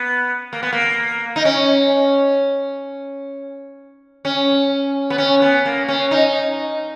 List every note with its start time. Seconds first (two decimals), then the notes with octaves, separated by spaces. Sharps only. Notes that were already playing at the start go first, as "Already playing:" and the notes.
Already playing: B3
0.53 A#3
0.63 B3
0.73 A#3
1.36 D#4
1.45 C#4
4.25 C#4
5.10 B3
5.18 C#4
5.42 B3
5.66 A#3
5.89 C#4
6.11 D#4